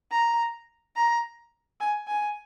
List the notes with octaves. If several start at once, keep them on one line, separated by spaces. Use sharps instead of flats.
A#5
A#5
G#5
G#5